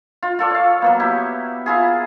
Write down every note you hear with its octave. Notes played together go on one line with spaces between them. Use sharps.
F4
F4 A4 D5
C#5 F5
F#3 A#3 B3
E4 G4
E4 F4 G#4